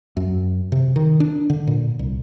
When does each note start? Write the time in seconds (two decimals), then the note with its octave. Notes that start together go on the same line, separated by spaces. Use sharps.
0.17 F#2
0.72 C3
0.96 D#3
1.20 D4
1.50 D3
1.67 A#2
1.99 C2